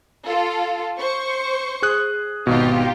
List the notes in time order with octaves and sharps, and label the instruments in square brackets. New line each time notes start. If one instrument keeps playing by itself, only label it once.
[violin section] F4 A4
C5 C#6
[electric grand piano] G#4 D#6 F#6
[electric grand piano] G#1 B2 [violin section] D#4 F4 G4